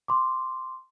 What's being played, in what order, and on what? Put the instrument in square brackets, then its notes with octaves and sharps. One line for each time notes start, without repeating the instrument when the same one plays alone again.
[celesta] C6 D6